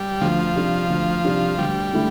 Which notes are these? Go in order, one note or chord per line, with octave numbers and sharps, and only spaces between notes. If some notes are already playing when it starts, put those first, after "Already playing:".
Already playing: G3
D2 F3
C3 G3 D4
D2
C3 G3 D4
D2 G3
D3 A3 E4